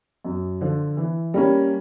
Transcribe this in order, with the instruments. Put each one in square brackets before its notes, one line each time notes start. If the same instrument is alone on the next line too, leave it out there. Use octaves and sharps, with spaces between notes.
[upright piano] F#2
D3 F3
E3
G3 A#3 C#4